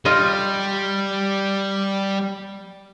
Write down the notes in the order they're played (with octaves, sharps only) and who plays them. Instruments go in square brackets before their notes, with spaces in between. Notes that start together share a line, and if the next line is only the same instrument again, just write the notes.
[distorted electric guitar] G3 [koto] F4 D#5